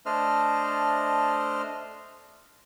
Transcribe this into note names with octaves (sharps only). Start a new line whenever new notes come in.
A3 D4 C5 D#5 F6